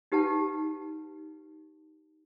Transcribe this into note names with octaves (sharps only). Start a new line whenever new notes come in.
D#4 G4 B4 F#5 A5